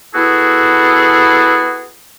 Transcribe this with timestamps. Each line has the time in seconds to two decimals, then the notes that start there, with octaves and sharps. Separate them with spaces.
0.14 B3 E4 F#4 G#4 A4